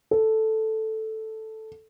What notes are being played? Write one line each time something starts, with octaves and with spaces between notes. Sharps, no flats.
A4